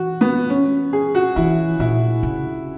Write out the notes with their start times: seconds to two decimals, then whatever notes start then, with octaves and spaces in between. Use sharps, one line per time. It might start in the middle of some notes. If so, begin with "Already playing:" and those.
Already playing: E3 F#4
0.21 B3
0.50 C#4
0.93 G#4
1.15 F#4
1.36 E3 E4
1.79 A#2 E4
2.23 C#3